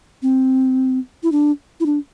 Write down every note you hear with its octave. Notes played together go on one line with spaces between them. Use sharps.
C4
E4
D4
E4
D4